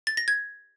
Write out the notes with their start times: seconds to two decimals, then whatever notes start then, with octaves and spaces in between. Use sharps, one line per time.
0.07 A6
0.17 A#6
0.28 G#6